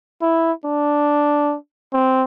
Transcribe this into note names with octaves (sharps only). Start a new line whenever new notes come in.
E4
D4
C4